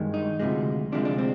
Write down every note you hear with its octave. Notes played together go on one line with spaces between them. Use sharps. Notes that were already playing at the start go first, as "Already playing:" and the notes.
Already playing: G2 D#3 G#3
D#4
D2 C3 F3 G#3
D2 C3 F3 G#3 D4
D4
C4